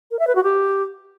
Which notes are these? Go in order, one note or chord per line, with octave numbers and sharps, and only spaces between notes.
A#4
E5
B4
F#4
G4